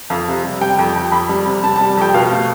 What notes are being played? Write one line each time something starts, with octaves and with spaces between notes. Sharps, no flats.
F2 F5
C3
G3
G3 G5
F2
F2
F2 B5
G3
C3
G3 A5
A5
G3
A5
F2 G5
B2 F5
A3